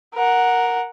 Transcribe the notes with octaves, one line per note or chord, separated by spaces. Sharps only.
A#4 F#5